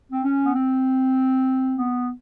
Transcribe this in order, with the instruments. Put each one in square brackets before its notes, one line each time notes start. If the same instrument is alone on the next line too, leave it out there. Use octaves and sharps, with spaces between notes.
[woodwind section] C4
C#4
B3
C4
B3